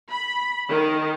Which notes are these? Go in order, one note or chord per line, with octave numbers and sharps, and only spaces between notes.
B5
D#3